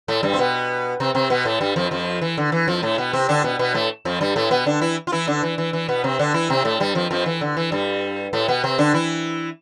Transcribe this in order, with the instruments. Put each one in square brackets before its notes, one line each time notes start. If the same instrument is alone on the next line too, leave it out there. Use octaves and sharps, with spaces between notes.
[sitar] A2 A3
G2 G3
C4
B2 B3
C3 C4
C3 C4
B2 B3
A2 A3
G2 G3
F2 F3
F2 F3
E3
D3
E3
F2 F3
A2 A3
B2 B3
C3 C4
D3 D4
B2 B3
B2 B3
A2 A3
F2 F3
G2 G3
A2 A3
B2 B3
D3 D4
E3 E4
F4
E3 E4
D3 D4
E3
E3
E3
B2 B3
C3 C4
D3 D4
E3 E4
C3 C4
A2 A3
G2 G3
F2 F3
F2 F3
E3
D3
E3
G2 G3
A2 A3
B2 B3
C3 C4
D3 D4
E3 E4